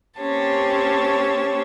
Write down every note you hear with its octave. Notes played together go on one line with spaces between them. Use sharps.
A#3 C4 C#4 G4 C#5 A5